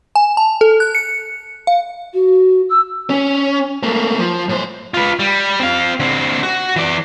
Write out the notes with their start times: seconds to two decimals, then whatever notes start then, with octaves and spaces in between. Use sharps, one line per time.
0.15 G#5
0.37 A5
0.61 A4
0.80 F#6
0.95 C#7
1.67 F5
2.14 F#4
2.69 E6
3.10 C#4
3.83 A3 A#3
4.20 F3
4.49 A2 C5
4.94 F4 B4
5.19 G3
5.60 C4 F5
6.00 D3 C4
6.43 F#4
6.76 E3 D5